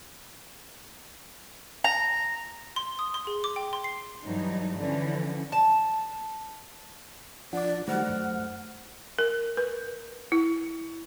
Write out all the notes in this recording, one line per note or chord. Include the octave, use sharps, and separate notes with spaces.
A#5
C6
D#6
C6
G#4
D6
G5
C6
C7
G2 E3 F#3 D#4
D3 E3 F3 C#4
A5
F3 D4 D5 F#5 D6
D#3 F#3 G3 A3 C5 F#5 F6
F#2
A#4
B4
E4